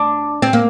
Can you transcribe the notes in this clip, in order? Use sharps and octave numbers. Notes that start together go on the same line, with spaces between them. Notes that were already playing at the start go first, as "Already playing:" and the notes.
Already playing: D4
C4
A#3